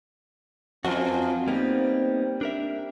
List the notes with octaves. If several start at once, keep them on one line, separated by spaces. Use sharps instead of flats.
F2 F3 C4 F4 F#4
G3 A#3 B3 D#4
D4 A#4 E5